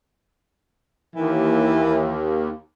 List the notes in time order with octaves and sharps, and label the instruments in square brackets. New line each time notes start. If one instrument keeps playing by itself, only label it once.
[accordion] D#2 [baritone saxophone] E3